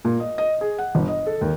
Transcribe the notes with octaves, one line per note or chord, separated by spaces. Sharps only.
A#2
D#5
D#5
G#4
F#5
G1
D#5
A4
D#2